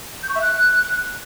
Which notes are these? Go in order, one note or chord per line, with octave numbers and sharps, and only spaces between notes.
G6
C#6
E5
F#6